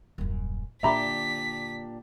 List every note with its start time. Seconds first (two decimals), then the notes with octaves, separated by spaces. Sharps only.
0.18 D#1 F#2
0.83 A#2 D3 D4 G4 E5 A#5 B5 B6